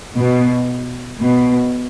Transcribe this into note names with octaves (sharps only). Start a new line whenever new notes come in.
B2
B2